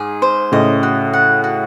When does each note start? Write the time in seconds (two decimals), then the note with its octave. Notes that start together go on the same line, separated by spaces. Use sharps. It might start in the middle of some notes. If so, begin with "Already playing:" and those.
Already playing: G#2 G#4
0.22 C5
0.52 A2 C#3 D#5
0.83 F#4
1.13 F#5
1.44 F#4